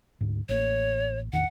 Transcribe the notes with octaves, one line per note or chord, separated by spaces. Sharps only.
D2 G#2
A1 A#3 C#5
A1 E2 D#3 F#5